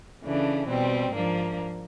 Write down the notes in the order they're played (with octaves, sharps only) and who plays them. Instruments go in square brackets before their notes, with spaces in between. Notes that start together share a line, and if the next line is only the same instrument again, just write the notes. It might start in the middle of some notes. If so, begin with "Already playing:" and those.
[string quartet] C#3 E3 A3 D4
B2 G3 C4
G#2 F3 A#3 D4